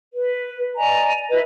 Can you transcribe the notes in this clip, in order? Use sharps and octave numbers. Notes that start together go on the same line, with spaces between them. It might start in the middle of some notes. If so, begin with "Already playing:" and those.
B4
D5 D#5 G#5 A#5
E4 B4 D#5